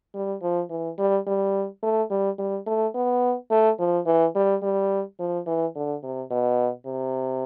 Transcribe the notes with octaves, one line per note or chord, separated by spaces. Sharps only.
G3
F3
E3
G3
G3
A3
G3
G3
A3
B3
A3
F3
E3
G3
G3
F3
E3
D3
C3
B2
C3